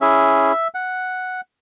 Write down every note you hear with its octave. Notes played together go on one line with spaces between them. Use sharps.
C#4 E4 G#4 E5
F#5